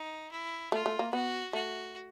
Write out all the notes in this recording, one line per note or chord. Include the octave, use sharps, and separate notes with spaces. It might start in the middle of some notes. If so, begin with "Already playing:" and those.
Already playing: D#4
E4
A3 F4
A3
A#3
B3 F#4
A3 F#4